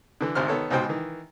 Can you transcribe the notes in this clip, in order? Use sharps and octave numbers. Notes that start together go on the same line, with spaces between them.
D3 E3
G#1 D2 C3 D#3 C5 F6
D#3 B3 A4 C#5
C#2 G#2 B2 C5 G5
D#3 E3